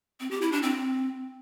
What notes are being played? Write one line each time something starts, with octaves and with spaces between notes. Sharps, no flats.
C4
G4
E4
D4
C4